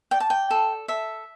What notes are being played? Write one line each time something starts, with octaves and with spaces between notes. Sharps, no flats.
D5 G5
A5
G5
A4
A4 E5